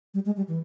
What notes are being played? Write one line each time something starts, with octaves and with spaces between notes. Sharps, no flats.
G3
G#3
G3
E3